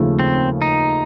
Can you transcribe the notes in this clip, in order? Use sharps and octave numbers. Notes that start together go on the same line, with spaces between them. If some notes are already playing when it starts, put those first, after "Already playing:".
Already playing: D#2 C#3 F3 A3
C4
D#4